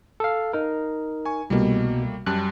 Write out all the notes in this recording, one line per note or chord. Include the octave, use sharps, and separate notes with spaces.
A4 F5
D#4 A#4
G#5 C#6
C2 B2 G3 A3 A#3
F#2 G3 A5 F#6